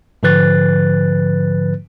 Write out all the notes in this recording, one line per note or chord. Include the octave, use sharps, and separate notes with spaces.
G#2 D3 F3 B4 F#6 A6